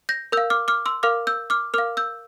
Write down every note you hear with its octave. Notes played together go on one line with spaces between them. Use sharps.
G6 A#6
A#4 E6 G6
F5
D6 F6
D6 F6
C6 E6
A#4 F5 D6 F6
E6 G6
D6 F6
A#4 F5 D6 F6
E6 G6